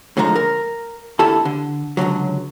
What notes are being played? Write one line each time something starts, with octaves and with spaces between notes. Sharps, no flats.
A2 D3 F3 G#3 A#5
A#4
D2 E4 G4 A4 A5
D3
C#2 G2 D3 F#3